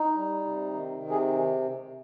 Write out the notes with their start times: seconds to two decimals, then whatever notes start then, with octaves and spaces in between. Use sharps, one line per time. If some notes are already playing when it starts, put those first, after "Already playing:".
Already playing: D#4
0.16 G3
0.45 C3
0.73 D#3
1.03 C3
1.11 G#4